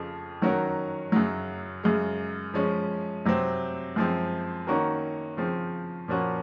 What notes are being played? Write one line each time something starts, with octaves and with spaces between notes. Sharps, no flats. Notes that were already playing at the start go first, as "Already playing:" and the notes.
Already playing: F2 C#3 F3
D#3 F#3 C#4 F#4 A#4
F#2 C#3 F#3
F#2 C#3 G#3
F3 G#3 C#4
C3 F#3 C4
F#2 F3 G#3 C4
D#3 A#3 C#4 F#4 A#4
C#3 F3 C4
A#2 F3 A#3 C#4 F#4